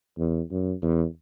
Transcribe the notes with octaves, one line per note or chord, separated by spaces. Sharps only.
E2
F#2
E2